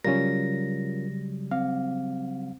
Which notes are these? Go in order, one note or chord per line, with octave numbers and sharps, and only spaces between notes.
C#3 F#3 G3 C#4 F4 A#4 A#6
C4 F5